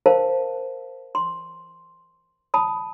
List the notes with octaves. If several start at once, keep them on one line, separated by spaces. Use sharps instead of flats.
A#4 C5 F5 A5
C6
A5 B5 D#6